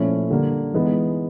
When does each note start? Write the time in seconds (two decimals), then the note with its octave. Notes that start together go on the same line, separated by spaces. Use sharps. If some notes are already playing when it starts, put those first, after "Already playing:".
Already playing: A#2 F3 A3 C#4 E4
0.30 D3 G3 A#3
0.74 E3 G#3 B3 D#4